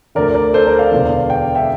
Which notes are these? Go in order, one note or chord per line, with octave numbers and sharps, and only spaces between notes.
D2 D3 A#4 D5
A#4 D5
A4 C5
A#4 D5
D5 F5
E1 E2 D3
G5
E5 G5